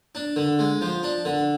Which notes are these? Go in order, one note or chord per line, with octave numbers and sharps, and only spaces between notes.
D4
D3
G#3
F3
D4
D3